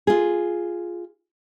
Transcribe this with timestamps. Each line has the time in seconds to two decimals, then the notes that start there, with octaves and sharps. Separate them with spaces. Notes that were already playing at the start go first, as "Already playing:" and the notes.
0.07 F4 G#4